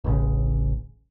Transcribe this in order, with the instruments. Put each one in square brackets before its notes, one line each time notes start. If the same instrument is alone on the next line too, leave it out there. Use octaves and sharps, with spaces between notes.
[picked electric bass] D1 A1 C#3